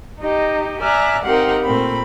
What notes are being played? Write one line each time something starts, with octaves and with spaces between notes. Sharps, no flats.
D#4 G4 D#5
D5 E5 G#5 A#5 F6 F#6
C4 D#4 G4 A#4 F5 F#5
A#2 A3 C4 B5